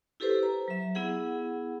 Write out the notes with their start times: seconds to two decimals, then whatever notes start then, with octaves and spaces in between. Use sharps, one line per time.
0.20 E4 G4 A4 B4 C5
0.43 A#5
0.68 F#3 E5
0.95 B3 E4 G#4 F#5